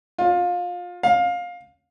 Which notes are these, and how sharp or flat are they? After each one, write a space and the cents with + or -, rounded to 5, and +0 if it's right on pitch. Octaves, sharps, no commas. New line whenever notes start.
F4 +25
F5 +20